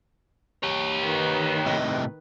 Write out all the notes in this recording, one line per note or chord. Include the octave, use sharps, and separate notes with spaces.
G4 C#5
D#3 B4
A2 C3 D#5